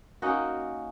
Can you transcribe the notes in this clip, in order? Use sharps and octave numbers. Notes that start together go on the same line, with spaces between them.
A#3 C#4 D#4 F#4